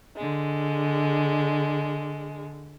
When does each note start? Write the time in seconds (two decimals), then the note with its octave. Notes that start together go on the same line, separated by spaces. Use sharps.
0.16 D3 G#3